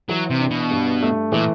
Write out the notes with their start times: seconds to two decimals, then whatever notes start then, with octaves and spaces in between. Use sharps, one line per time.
0.09 E3 F#3
0.30 C3
0.40 D4
0.50 B2
0.71 G2
1.02 A3
1.32 A#2 E3